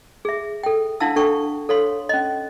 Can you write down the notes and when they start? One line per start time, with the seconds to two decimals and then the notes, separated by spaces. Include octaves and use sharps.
0.25 G#4 E5
0.63 A4 G5
1.00 D4 E4 F5 F#5 A5 E6
1.16 D4 A4 G5 C#6
1.69 A4 C#5 F5 C6
2.09 C#4 D#5